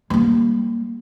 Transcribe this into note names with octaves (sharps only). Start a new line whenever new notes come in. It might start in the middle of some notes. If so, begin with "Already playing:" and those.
G3 A#3